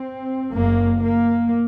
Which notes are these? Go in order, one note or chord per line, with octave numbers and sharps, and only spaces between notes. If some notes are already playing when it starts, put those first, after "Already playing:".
Already playing: C4
F#1 F#2 A#3
A#3